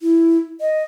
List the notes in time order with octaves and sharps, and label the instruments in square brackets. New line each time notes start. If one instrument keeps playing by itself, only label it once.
[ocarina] E4
D#5